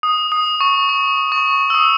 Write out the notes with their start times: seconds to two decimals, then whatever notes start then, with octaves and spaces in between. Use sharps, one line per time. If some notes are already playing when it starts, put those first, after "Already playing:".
0.03 D#6
0.32 D#6
0.61 C#6
0.89 C#6
1.32 C#6
1.70 E6
1.74 D#6